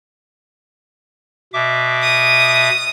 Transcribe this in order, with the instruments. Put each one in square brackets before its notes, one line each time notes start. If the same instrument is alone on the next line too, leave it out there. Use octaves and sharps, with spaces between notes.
[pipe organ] B2 E5 D6
[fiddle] D#6